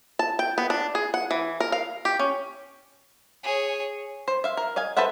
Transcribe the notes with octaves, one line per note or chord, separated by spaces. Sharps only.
A5
G5
B3
D4
G#4
F#5
E3
A#4
F5
G4
C#4
G#4 C#5
C5
E5 F5
A#4
D#5 F5 G#5
A4 B4 C5 E5 F#5